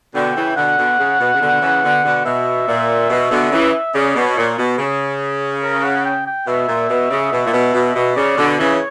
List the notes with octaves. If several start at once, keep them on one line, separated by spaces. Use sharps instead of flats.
B2 D3 G5
C#3 E3
B2 D3 F#5
B2 D3
C#3
B2
C#3
B2 D3
C#3 E3
B2 D3
B2 D3
B2 E5
A#2
B2
B2 D3
C#3 E3
C#3 D5
B2
C#5
A#2
B2
C#3
A#4
F#5
G5
G5
B2 E5
A#2
B2
C#3
B2
A#2
B2
B2
B2
C#3 D5
B2 D3
C#3 E3
C#5